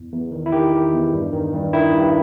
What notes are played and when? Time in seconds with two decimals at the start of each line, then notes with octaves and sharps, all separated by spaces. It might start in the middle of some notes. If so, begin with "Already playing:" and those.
Already playing: E2
0.12 E2
0.31 D#3
0.46 E4
0.52 D#3 G4
0.72 D#3
0.93 E2
1.13 G2
1.33 D#3
1.53 G2
1.73 D#3 E4
1.93 G2